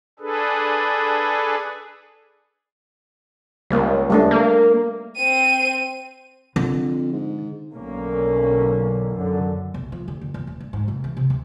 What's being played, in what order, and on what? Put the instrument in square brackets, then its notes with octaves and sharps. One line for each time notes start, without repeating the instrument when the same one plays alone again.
[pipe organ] D4 G#4 A4 B4
[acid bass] C#2 [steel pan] G3 A#3
[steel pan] G3 A3 D4
[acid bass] A#3
[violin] C4 D#7
[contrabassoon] F2 [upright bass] D3
[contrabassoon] G#2
[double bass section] B1 D3 A#3 C#4
F#2 D3
[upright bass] B1
F3
D3
F#1
E2
D#1
G2
G#2
F1
E3
C3
D2